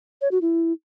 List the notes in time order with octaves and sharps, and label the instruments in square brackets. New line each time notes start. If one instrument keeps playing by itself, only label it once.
[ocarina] C#5
F#4
E4